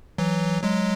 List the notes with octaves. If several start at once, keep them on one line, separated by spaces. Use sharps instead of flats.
E3 F#3
F#3 G#3